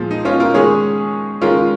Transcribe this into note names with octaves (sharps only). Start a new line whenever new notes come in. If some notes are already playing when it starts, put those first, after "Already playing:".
Already playing: A#2 F3 G#3
D#4
C#4 F4
F4 A#4
D#3 G#3 C#4 G#4 C#5
D#3 G#3 C#4 F4 A#4